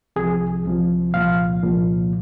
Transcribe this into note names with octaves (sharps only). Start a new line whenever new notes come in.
C2 C3 F3 G#4
C2 C3 F3
C2 A#2 F3 F5
C2 A#2 F3